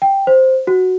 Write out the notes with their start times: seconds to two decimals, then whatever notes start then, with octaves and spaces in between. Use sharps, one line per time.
0.02 G5
0.27 C5
0.67 F#4